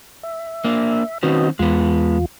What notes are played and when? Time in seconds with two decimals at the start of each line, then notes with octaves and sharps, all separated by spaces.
0.23 E5
0.64 A#3 D4
1.23 D#3 C4 C#4 F#4 B4 D#5
1.59 E2 G#3 B3 F4